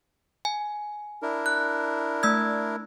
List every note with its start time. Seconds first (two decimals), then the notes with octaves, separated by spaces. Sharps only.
0.45 G#5
1.22 D4 E4 A#4
1.46 F#6
2.23 A3 E6 G#6